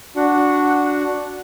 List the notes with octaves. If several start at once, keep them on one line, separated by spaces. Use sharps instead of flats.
D4 F#4 F#5